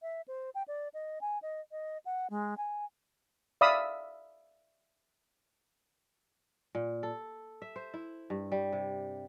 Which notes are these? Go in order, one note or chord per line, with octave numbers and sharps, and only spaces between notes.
E5
C5
G5
D5
D#5
G#5
D#5
D#5
F#5
G#3
G#5
D5 E5 F5 B5 D#6 E6
A#2
A4
E5
C5
E4
G2
G3
C3